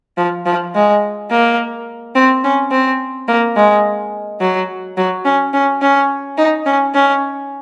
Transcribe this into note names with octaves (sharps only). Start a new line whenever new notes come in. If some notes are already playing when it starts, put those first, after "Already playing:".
F3
F3
G#3
A#3
C4
C#4
C4
A#3
G#3
F#3
F#3
C#4
C#4
C#4
D#4
C#4
C#4